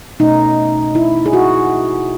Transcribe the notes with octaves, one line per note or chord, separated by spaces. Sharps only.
B2 A3 C#4 D#4
E4
G#4
F#4